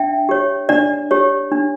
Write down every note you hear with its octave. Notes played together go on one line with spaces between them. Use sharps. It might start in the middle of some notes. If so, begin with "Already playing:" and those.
Already playing: D4 E5 G5
G4 C#5
D4 D5
G4 C#5
D4